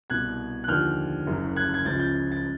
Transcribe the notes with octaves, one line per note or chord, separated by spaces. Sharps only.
C2 B2 F#6 G#6
F#6
D#2 D3 F3 F6 G6
F#1 F#2 C#3
F#6 G#6
G#6
C#2 C#3 F3 G6 A6
G6 A6
A6